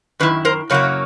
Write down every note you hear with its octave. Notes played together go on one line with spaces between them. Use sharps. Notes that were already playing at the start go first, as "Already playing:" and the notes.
F#2 D#3 E4 B4
A#4 C5
F#2 C#3 F#3 A#3 C#5